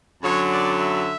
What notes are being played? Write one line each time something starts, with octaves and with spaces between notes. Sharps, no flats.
F#2 D3 F#3 C#5
D5
E5